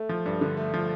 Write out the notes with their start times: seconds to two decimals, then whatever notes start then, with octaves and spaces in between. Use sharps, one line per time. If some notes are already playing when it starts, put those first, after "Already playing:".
Already playing: A3
0.09 F3
0.26 G2
0.41 D3
0.57 A3
0.74 F3